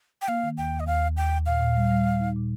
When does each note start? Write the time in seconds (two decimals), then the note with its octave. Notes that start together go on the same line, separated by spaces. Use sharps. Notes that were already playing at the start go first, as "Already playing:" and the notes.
0.22 G5
0.28 A#3 F5
0.43 D#3
0.58 D#2 G5
0.73 D#2
0.80 D#5
0.87 D#2 F5
1.02 D#2
1.17 D#2 G5
1.31 D#2
1.46 A#2 F5
1.61 A#2
1.76 G3
1.91 G3
2.06 A#2
2.20 D#4
2.36 A#2